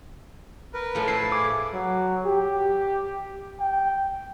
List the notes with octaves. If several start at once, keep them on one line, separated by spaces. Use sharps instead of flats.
A#4 B4
A2 F3
E4 B4 E5 A5 C7
G#4 D6
F#3
G4
G5